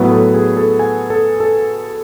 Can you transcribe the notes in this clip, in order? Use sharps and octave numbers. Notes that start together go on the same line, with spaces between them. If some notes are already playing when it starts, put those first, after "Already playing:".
Already playing: A2 F#3 B3 B4
A4
G#4
A4
G#5
A4
A4